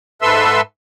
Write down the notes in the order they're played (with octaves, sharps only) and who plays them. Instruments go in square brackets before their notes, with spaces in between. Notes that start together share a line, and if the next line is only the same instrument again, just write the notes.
[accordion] G#2 A4 B4 E5 C6 E6